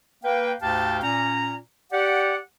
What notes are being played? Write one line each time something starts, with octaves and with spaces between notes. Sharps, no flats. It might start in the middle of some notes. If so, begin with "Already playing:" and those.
A#3 B4 G5
D2 G#2 G4 F5 G5 A5
A#2 C#4 A#5
G4 D5 F#5